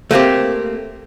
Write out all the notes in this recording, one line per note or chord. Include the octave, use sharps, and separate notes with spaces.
A3 A#3 C4 G4